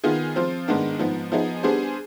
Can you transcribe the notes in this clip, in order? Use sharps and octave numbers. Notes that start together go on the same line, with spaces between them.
D#3 B3 F4 G#4
F3 C4 F4
G#2 D#3 G#3 B3 D4
G#2 F3 B3
F3 B3 D#4 G#4
G3 B3 D4 G#4 C5